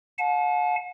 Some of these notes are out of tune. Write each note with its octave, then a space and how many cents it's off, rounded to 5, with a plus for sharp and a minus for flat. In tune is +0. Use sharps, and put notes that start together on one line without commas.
F#5 -45 A5 -35